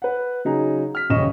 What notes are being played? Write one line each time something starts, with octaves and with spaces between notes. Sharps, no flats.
B4 F#5
C#3 F#3 D#4 G#4 A#5
F6 B6
D#1 A1 C#3 D#5 C#6 E7